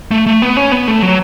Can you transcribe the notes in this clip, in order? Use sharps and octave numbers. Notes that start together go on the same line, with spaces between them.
A3
A3
B3
C#4
B3
A3
F#3